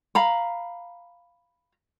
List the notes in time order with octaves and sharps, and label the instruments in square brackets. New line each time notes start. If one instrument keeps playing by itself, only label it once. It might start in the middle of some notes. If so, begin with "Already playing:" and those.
[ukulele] F5 A#5 B5